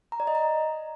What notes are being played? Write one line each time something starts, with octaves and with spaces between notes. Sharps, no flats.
A#5
D5
D#5
A#5